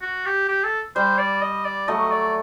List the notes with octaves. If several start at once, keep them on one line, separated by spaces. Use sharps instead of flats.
F#4
G4
G4
A4
G3 C5
D5
D#5
D5
F#3 A3 D#5
D5